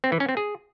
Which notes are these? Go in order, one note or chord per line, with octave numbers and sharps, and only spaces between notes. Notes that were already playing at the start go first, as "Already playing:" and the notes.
C4
E3
C#4
C4
G#4